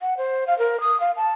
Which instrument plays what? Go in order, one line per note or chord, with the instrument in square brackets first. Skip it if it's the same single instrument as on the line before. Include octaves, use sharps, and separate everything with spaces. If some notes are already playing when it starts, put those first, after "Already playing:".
[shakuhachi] F#5
C5
F5
A#4
D#6
F5
A5